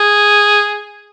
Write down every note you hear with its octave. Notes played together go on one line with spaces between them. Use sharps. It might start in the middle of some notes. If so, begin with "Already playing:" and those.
Already playing: G#4